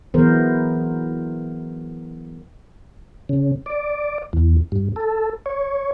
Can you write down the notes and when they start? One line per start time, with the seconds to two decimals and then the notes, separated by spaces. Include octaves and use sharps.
0.14 E3 F#3 B3 G#4 A#4 C5
3.29 C#3
3.66 D5
4.33 E2
4.72 G2
4.96 A4
5.46 C#5